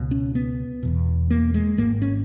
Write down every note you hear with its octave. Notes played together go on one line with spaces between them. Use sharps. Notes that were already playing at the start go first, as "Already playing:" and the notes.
Already playing: C#2 B2
C#4
B3
E1 E2 B2
A#3
G#3
G#1 G#2 A#3
C#4